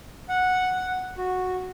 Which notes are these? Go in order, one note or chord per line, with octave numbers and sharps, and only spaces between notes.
F#5
F#4